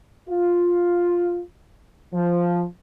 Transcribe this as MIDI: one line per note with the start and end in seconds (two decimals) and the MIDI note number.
0.29 1.42 65
2.14 2.63 53